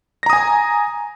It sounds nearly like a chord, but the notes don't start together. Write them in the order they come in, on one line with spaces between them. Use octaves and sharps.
A#6 A#5 D#6 G#5